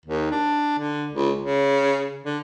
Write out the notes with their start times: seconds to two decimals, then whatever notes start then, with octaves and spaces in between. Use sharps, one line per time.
0.06 D#2
0.31 D4
0.78 D3
1.13 C#2
1.41 C#3
2.24 D3